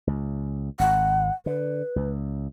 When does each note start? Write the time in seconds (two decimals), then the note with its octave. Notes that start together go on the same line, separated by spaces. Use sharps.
0.07 C#2
0.79 G#1 F#5
1.46 D3 B4
1.96 C#2